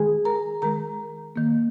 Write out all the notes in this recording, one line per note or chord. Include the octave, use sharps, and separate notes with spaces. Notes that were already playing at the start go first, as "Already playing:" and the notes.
Already playing: D#3 G#3 G#4 G#5
A#4 A#5
D#3 G#3 A#4 A#5
D#3 A#3